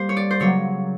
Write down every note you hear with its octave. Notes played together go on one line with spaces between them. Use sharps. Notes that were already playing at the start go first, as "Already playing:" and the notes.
Already playing: G3 A#3 C5
C#5
D5
C5
C#3 F#3 A#3 C#5